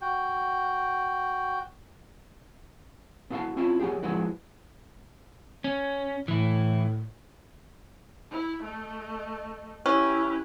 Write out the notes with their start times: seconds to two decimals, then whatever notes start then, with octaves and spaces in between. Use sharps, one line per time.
0.01 F#4 G5
3.30 B3 E4 F#4 F5 F#5 A5
3.56 C4 C#4 E4 F4 E5
3.80 F#3 B3 D4 G4 G#4
4.03 F3 F#3 G#3 B3 E4 F#4
5.64 C#4
6.28 A2 E3 E4
8.31 E4
8.63 A3 D#5
9.86 C#4 E4 G4 B4